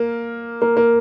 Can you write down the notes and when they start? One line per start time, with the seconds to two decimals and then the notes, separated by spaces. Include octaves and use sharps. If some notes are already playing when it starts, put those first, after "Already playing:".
Already playing: A#3
0.62 A#3
0.77 A#3